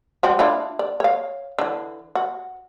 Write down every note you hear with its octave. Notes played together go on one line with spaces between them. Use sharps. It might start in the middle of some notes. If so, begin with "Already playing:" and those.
G3 C4 F#4
D4 E4 F4
D5
C#5 F5
D3 E3
F#4